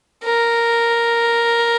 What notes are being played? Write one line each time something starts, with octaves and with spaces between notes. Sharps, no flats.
A#4